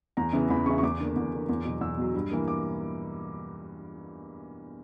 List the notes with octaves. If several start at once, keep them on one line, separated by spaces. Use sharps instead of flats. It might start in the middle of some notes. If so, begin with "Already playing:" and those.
E2 A#5
C#3 E3 B3 E4
E2 B5
C#3 E3 B3 E4 C#6
C#6
E2 D6
D3 A#3 D4
E2
D3 A#3 D4
E2
B2 F#3
E2 E6
B2 F#3
G2
E3 A#3
D6